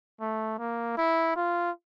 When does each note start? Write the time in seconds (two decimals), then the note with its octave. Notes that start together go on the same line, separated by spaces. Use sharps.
0.21 A3
0.59 A#3
0.97 E4
1.36 F4